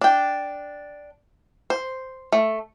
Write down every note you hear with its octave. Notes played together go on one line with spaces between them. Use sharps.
D4 G5
C5
A3